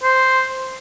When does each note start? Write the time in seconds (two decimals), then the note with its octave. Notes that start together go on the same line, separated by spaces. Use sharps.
0.03 C5